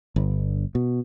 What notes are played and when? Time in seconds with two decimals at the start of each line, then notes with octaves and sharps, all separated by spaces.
0.16 G1
0.75 B2